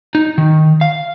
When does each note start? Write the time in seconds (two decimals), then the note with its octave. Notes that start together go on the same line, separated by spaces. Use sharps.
0.15 D#4
0.38 D#3
0.81 F5